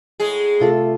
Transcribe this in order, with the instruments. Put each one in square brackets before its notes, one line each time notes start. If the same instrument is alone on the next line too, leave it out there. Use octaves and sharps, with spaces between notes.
[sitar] A2 G#3 G#4
[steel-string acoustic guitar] C3 F4 A4 [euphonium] A3